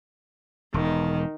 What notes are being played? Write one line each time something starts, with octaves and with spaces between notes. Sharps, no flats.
E1 D#3